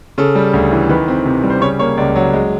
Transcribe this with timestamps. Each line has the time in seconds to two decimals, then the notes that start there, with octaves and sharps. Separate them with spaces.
0.18 C#3 A4
0.35 G3
0.54 D2
0.71 E3
0.89 D#3 B4
1.08 C4
1.25 C3
1.43 G3
1.50 C5
1.61 C#3 C#5
1.79 A#3 C#5
1.97 C#2 D5
2.16 F#3
2.33 G#3